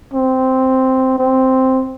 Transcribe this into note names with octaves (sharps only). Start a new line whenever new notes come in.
C4
C4